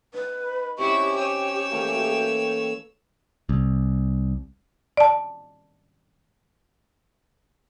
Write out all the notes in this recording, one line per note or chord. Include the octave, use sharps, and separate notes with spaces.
D#4 B4
B5
C3 C#4 E4 G4 C#6 E6
C#5 G5 E6
E3 A3 A#3
C2
D5 A5